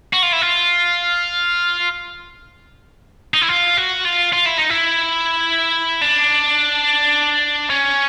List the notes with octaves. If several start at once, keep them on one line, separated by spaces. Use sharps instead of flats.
F#4
F4
E4
F4
D#4
E4
F4
F#4
F4
F4
E4
D#4
E4
D4
C#4